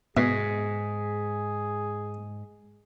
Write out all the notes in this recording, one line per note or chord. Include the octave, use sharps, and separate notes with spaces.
G#2 B2 G#4